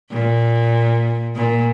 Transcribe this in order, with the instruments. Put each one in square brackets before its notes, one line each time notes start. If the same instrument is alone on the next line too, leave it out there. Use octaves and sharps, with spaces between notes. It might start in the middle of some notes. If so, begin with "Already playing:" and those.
[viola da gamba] A#2
A#2